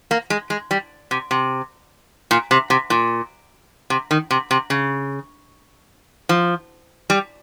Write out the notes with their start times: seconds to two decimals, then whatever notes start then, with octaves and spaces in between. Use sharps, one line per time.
0.11 A#3
0.30 G#3
0.50 G#3
0.71 G3
1.11 C3
1.31 C3
2.31 A#2
2.51 C3
2.70 C3
2.90 A#2
3.90 C3
4.11 D#3
4.31 C3
4.51 C3
4.70 C#3
6.29 F3
7.10 G3